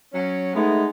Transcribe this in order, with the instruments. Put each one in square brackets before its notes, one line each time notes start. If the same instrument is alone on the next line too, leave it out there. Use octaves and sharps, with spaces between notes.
[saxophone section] F#3 C#4
[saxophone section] G#3 B3 D#4 [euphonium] A3